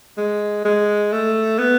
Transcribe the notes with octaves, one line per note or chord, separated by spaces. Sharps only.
G#3
G#3
A3
B3